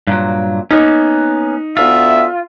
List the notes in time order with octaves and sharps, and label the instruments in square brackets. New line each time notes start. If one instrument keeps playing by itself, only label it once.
[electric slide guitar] G2 A#2 F#3
[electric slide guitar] A#3 B3 C#4 [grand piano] D#4
[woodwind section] D2 B3 E5 [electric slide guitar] F4